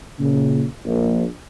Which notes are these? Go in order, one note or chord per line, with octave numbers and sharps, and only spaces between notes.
A#2 C#3
A#1